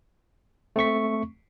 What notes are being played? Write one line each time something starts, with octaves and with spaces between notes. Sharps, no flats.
A3 C4 C#6 B6